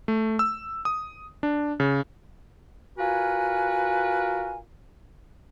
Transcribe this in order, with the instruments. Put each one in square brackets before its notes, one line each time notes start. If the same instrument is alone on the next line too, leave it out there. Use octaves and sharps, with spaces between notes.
[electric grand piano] A3
E6
D#6
D4
C#3
[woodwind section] F4 F#4 A#4 B4 G#5